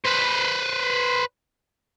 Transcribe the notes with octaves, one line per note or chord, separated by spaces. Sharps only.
B4 C5